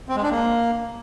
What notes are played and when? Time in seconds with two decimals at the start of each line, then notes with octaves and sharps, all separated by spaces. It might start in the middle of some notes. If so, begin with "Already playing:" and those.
0.09 C4
0.16 G#3
0.23 D4
0.31 A#3